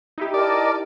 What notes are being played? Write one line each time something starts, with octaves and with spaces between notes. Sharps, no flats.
D#4 E4 G4
A#4 D5 D#5 A5